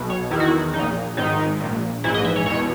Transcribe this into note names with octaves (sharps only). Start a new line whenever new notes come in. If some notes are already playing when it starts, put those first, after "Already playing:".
Already playing: B1 B2
C#5
E2 D#3 E4
F#4
E4
A#1 A#2 D#4
G#1 G#2 D#3 D#4
A#1 A#2
A#1 G#2 E3 E4
D#5
E5
C#5
E2 B2 C#5